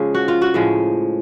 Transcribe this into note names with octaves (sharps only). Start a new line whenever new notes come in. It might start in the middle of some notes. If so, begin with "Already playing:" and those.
Already playing: C#3 F3 G#3
F#4
F4
F#4
A2 F3 G#3